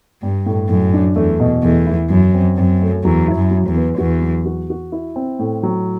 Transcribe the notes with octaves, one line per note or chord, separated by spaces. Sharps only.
G2 G3
A2
F#2 A2
D4
E2 A3
B2
E2 A3
E4
F#2 F#3
C4
F#2 C4
A3
E2 F#3
E4
F#2
F#3
E2
B3
E2 F#4
F#3
F#4
F#4
E4
C4
A2
F#3